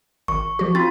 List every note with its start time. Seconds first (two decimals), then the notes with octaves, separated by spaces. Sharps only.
0.28 G#1 C#6
0.59 F3 F#4
0.75 C4 F4 C6 A6